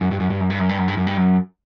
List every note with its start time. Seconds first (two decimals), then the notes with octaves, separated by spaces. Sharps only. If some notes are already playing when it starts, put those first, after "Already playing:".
0.01 F#2
0.11 G2
0.20 F#2
0.30 G2
0.40 F#2
0.50 G2
0.60 F#2
0.69 G2
0.78 F#2
0.88 G2
0.97 F#2
1.07 G2
1.17 F#2